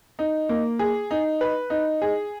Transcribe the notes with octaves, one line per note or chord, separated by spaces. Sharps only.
D#4
A#3
G#4
D#4
B4
D#4
G#4